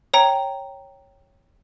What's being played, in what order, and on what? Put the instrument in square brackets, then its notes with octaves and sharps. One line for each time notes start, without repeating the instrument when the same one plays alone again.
[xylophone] C#5 G5 A#5